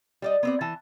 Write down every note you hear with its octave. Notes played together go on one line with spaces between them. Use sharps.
G3 D5 D#5
B3 C4 D5
E3 A5